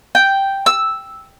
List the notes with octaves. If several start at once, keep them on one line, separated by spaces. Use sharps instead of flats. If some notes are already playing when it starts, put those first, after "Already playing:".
G5
E6